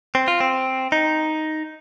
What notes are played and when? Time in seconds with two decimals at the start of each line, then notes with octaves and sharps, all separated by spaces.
0.15 C4
0.28 F4
0.40 C4
0.92 D#4